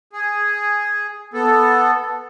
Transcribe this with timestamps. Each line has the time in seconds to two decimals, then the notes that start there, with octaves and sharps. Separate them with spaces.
0.13 G#4
1.34 B3 A4